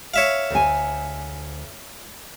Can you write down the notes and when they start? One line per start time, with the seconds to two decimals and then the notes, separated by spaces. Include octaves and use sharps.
0.14 C#5 E5 F5
0.50 D2 G#5